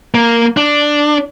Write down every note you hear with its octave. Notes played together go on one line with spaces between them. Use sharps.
A#3
D4